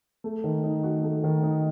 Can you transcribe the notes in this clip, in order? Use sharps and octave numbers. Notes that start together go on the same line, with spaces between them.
A3
D#3
D#4
F#4
A3
D#3
D#4